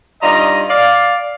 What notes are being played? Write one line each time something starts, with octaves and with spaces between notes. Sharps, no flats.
G2 D#4 F4 D5 D#5 A#5
D5 F5